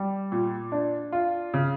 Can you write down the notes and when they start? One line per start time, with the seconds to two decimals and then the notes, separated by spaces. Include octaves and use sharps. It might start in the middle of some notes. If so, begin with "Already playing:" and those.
Already playing: G3
0.32 A#2
0.72 D4
1.12 F4
1.54 C#3